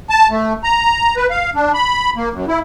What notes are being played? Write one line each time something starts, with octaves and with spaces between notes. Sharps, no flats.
A5
A3
A#5
B4
F5
D4
B5
A#3
F#2
E4